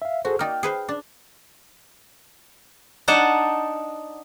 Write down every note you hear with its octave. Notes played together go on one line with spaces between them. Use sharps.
E5 F5
F#4 G#4 A4 C5
A#3 D#4 D5 G5 F6
G#4 B4 C5
D4
D4 D#4 F#5 A5